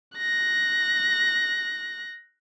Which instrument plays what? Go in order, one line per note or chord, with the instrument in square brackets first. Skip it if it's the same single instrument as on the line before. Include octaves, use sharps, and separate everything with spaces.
[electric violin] F#6 A#6